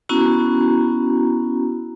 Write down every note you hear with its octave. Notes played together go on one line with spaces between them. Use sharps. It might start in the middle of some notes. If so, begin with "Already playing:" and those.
B3 C#4 E4 F#4 A#5